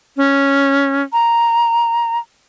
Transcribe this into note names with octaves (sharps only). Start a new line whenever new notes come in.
C#4
A#5